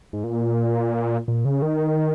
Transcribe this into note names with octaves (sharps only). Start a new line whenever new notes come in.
G#2
A#2
A#2
C#3
D#3